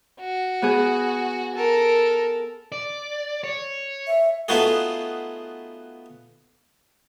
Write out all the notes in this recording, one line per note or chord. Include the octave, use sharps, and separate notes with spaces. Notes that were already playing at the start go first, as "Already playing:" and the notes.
F#4
B3 G#4
A4 A#4
D5
C#5
E5
A3 B3 D#4 F4 F#4 G#4